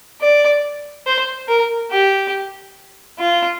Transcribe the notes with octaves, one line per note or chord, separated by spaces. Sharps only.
D5
C5
A#4
G4
F4